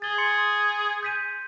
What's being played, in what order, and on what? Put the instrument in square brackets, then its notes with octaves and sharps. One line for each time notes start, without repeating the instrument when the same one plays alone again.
[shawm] G#4 [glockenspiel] A6 G7
[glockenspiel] C6 A6 C#7
G6 B6 D#7